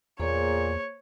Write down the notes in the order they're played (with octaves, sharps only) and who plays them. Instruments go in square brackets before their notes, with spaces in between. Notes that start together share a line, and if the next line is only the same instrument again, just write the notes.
[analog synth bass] E2 [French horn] A#2 [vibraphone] A#3 G#4 C5 [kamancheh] C#5